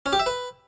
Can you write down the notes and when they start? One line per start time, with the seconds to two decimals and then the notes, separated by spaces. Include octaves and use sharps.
0.06 C#4
0.13 G4
0.19 E5
0.26 B4